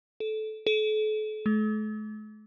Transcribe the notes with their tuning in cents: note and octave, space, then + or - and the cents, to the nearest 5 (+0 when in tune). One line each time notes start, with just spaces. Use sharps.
A4 -20
A4 -40
A3 -45